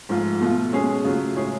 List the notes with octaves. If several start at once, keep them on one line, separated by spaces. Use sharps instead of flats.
G#2 F3 A3 F4
B2 A3 F4
B2 G#3 C#4 G#4
C#3 F#3 A3 F4
A2 G#3 C#4 G#4